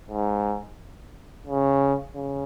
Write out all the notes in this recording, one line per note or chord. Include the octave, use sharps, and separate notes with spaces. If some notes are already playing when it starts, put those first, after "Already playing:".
G#2
C#3
C#3